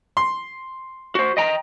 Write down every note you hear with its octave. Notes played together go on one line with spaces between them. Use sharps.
C6
F#4 C5
D#5 G5 A#5